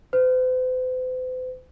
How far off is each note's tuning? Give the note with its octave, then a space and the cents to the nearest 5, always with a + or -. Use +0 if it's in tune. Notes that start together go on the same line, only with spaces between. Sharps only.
C5 -45